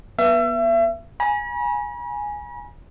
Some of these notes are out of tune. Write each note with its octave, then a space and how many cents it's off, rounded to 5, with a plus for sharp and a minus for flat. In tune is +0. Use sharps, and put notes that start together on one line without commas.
B3 -30 E5 +35
G#5 +0 B5 -45